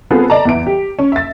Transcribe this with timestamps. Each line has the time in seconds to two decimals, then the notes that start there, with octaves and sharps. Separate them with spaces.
0.11 B3 C4 F4 G#4 A4 B4
0.30 D5 A5 A#5
0.45 E2 E3 D7
0.67 G4
0.99 C#4
1.12 E5 A6